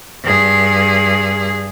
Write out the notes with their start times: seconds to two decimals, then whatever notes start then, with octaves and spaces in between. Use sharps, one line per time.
0.23 G2 G#4